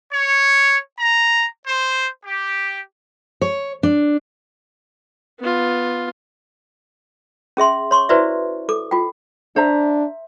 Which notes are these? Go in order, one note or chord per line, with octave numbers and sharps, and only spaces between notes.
C#5
A#5
C5
G4
C#5
D4
B3 F4
C#4 G#4 E5 C6
C#5 C6 C#6
E4 F#4 B4 C5 D5 E5
A4 D6
F4 G5
D4 C5 E5 A#5